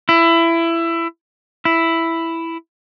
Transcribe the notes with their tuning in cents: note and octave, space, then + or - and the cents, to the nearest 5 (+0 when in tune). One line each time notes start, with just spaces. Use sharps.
E4 +20
E4 +5